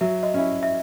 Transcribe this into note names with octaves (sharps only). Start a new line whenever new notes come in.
F#3 E5
D#5
C#4 E4
E5